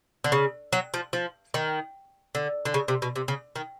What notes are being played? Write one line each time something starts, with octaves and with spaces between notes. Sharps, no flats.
D3
C#3
F#3
F3
F3
D#3
D3
D3
C#3
C3
B2
C3
C#3
D#3